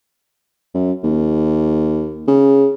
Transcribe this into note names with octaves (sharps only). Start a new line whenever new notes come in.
F#2
D#2
C#3